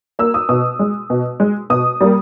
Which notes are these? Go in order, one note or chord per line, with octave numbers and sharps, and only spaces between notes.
A#3 E6
D#6
B2 D#6
G#3
B2
G#3
B2 D#6
G3 A#3